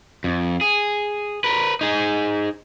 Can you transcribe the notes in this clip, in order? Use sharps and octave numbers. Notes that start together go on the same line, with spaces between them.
F2
G#4
A#4 B4
D#4 G#4